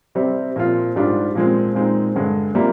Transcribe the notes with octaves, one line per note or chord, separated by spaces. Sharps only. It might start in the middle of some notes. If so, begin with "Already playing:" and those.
C3 G3 C4
A#2 F3 C4 F4
G#2 G3 D4 F4
A#2 F3 G#3 C4
A#2 G#3 C4 D#4
G2 D3 G#3
C3 G3 A#3 F4